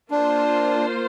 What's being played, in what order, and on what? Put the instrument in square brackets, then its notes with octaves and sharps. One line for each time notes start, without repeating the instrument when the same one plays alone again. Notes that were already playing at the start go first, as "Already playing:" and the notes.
[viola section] A#3 F4 C5 [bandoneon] D4